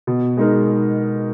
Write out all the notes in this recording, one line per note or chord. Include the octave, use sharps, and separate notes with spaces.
B2
G#3 D#4 A#4